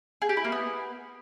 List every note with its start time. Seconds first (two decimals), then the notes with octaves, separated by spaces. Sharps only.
0.22 G#4
0.29 G4
0.37 E4
0.44 A#3
0.52 B3